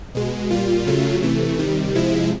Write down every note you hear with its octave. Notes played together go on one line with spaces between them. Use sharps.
B2 G#3
A#2 G3 F4
C#3 F#3 A3
C3 E3 A3
C3 D#3 G3
C3 F3 G#3 E4